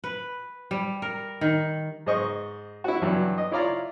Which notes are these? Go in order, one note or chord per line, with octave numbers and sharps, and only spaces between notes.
B4
G3
A#4
D#3
G#2 C5 D#5 C#6
E4 F#4
G2 E3 F#3
D#5
E4 F4 C#5 D5 F5 A#5